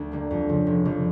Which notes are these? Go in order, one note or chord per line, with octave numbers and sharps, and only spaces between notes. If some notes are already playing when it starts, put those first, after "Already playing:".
Already playing: D2 D4
D3 G3 A#3
F2
C#3 F3
F1
F2 D3 G3